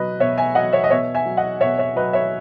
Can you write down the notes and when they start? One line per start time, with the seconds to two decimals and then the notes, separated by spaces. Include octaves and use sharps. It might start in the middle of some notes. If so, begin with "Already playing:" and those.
Already playing: B2 F#3 B4 D#5
0.20 B2 C#5 E5
0.38 E5 G#5
0.55 F#3 D#5 F#5
0.73 C#5 E5
0.84 D#5
0.90 B2 C#5 E5
1.15 E5 G#5
1.26 F#3
1.37 D#5 F#5
1.61 B2 C#5 E5
1.78 C#5 E5
1.96 F#3 B4 D#5
2.13 C#5 E5